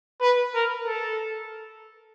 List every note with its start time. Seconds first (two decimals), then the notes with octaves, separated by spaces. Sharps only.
0.21 B4
0.54 A#4
0.87 A4